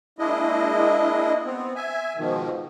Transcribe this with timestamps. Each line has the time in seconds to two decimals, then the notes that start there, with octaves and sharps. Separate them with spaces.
0.19 G#3 A#3 D4 E4 D#5
1.45 B3 C4
1.76 E5 G#5
2.17 G#2 B2 D#3 F3